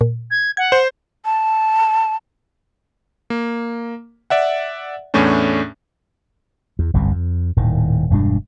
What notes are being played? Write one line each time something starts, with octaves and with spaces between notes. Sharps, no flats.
A#2
G#6
F#5 G#6
C5
A5
A#3
D5 E5 F#5
E2 A2 A3 C#4 D4
E2
G1 C2 F#2 C3
F2
D#1 A2 D#3
E1 G2 G#3 D4